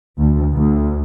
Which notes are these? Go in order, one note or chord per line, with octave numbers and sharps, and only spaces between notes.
D2
D2